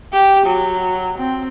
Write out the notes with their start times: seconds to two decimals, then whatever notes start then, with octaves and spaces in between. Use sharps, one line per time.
0.13 G4
0.46 F#3
1.18 C4